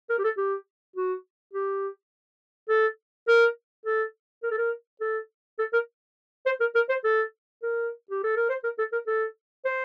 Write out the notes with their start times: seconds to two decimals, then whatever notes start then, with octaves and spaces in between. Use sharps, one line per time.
0.09 A#4
0.19 G4
0.24 A4
0.37 G4
0.96 F#4
1.53 G4
2.69 A4
3.28 A#4
3.86 A4
4.43 A#4
4.51 A4
4.58 A#4
5.01 A4
5.59 A4
5.73 A#4
6.46 C5
6.60 A#4
6.75 A#4
6.89 C5
7.04 A4
7.63 A#4
8.11 G4
8.24 A4
8.36 A#4
8.49 C5
8.64 A#4
8.78 A4
8.93 A#4
9.07 A4
9.65 C5